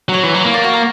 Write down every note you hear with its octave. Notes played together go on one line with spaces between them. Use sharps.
F#3 C#5
E3
F#3
A#3
D5
F#4
A#4